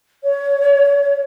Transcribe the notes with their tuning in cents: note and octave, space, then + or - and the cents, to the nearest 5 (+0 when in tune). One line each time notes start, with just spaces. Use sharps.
C#5 +20